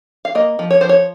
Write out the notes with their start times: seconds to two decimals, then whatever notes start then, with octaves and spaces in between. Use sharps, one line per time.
0.25 F5
0.35 A#3 D#5
0.59 F3
0.71 C#5
0.81 F3 C5
0.89 C#5